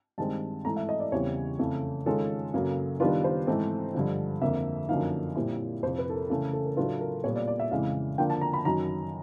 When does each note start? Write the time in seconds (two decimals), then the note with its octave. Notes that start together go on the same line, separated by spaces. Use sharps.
0.18 G2 D#3 G#3 C4 A5
0.65 G#2 E3 A3 A#5
0.77 E5
0.89 D#5
1.00 D5
1.12 E2 C#3 E3 G3 C4 C#5
1.59 F2 C#3 E3 A3
2.06 D#3 G#3 C#4 F4 A4
2.54 F#2 C#3 F#3 A#3
3.00 D#3 G3 B3 D4 F4 B4
3.24 C5
3.47 G#2 E3 A3 C4
3.94 G2 D3 F3
4.42 F2 D3 F3 A#3 E5
4.88 F#2 D3 F3 A#3 D#4 F5
5.36 A#2 G3 C4 E4
5.83 F2 C3 F3 C5
5.98 B4
6.10 A4
6.14 A#4
6.30 C#3 E3 A3 C#4 A#4
6.53 A4
6.65 A#4
6.77 A2 F#3 A3 D4 F4 B4
7.01 A#4
7.24 A#2 G3 B3 C#5
7.36 D5
7.48 D5
7.60 E5
7.71 F2 C#3 E3 G#3 F5
8.18 D3 F3 A#3 D4 F4 G5
8.30 A5
8.41 A#5
8.54 B5
8.65 F#2 D#3 F#3 A#5